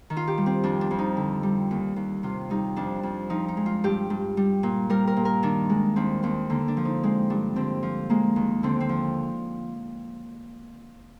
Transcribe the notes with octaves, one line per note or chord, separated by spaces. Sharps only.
D#3
F4
G4
G3
C4
F2 D4
D4
F2
D#4
D3
G3
D#2
D#2
C3 F4
G3 D#4
F2 D4
F2
F3 D#4
D#4
G#3
F4
G2 G4
G2
G3
A#2
G3 A#4
A#4
A#2
A#4
D#3 D4
G#3
D#2 C4
D#2 C4
D3 A#3
D4
F3
D#4
G#3 C4
G2 D4
D3 C4
F3
G#3 A#3
D#2
D3 C4
C4
F3